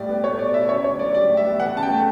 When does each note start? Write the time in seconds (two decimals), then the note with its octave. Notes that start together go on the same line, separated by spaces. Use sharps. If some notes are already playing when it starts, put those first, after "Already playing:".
Already playing: A2 G3 D5
0.09 B3
0.24 A3 C#5
0.39 B2 D5
0.54 E4 E5
0.69 C#3 C#5
0.84 D2 C#5
0.99 F#3 D5
1.15 G3 D5
1.29 A2
1.37 E5
1.45 B3
1.60 E3 F#5
1.75 C#3 A5
1.83 G5
1.90 A3